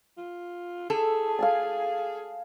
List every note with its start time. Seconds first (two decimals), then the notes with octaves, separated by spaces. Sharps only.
0.18 F4
0.90 G#4 A4
1.39 F5 G#5 A5